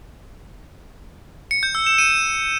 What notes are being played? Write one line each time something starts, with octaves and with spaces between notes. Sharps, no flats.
C#7
G6
E6
E7
D#7